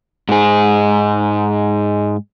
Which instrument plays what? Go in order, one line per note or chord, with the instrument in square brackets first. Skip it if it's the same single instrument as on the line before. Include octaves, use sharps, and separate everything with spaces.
[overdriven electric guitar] G#2 G#4